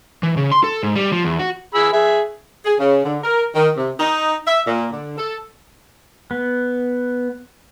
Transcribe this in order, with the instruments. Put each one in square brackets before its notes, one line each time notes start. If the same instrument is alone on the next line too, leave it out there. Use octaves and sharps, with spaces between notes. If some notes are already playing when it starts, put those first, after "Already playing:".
[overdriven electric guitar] E3
C#3
C6
A4
G#2
G3
F3
E2
F#4
[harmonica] G#4 B5 E6
G#4 E5
[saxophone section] G#4
C#3
D3
A#4
D#3
C3
D#4
E5
A#2
D3
A4
[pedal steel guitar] B3